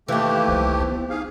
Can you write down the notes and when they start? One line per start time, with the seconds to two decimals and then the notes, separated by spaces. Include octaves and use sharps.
0.08 D#2 E3 A3 G4 F5
0.48 C2 F#3 C5
0.80 B3 C4
1.10 D#4 G#4 F5